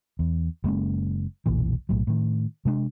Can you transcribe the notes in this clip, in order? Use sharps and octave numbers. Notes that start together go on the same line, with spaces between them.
E2
F#1 G#3 A#3 C#4
F1 B1 A#2 E3
B1 A2 F#3
A2 D#3
C3 G#3 C4 D4